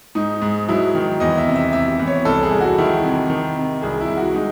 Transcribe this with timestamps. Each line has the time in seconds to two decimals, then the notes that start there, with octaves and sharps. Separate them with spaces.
0.15 G#2 D#4
0.42 G#2
0.69 F#3 E4
0.95 D#3
1.20 E2 D#5
1.38 E5
1.47 C3
1.56 E5
1.73 C3 E5
1.99 E2
2.07 C#5
2.25 C2 A4
2.43 G#4
2.51 C2
2.60 F#4
2.78 D#3 E4
3.04 C3
3.30 D#3
3.56 C3
3.82 C2 G#4
4.00 E4
4.08 C2
4.17 F#4
4.35 G#3 D#4